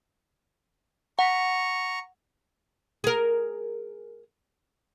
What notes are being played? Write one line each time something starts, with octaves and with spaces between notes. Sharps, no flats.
F#5 A#5 C#6
G#4 A#4